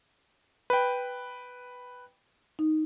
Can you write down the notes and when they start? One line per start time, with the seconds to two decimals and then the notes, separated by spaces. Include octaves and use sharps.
0.70 B4 G5
2.59 D#4